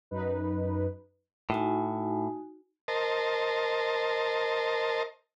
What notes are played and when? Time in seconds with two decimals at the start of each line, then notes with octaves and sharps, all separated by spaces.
0.11 F#2 D#4 B4
1.50 A2 D#4 F#4 G#5
2.88 A#4 C5 D#5 A5